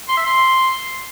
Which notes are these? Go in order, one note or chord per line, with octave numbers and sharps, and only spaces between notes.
C6
E5
C6